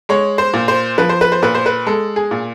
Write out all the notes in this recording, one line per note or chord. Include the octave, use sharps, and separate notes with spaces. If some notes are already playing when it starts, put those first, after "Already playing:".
G#3 C#5
C5
A#2
C5
F3 B4
C5
B4
C5
A#2 B4
C5
B4
G#3 A4
G#4
A#2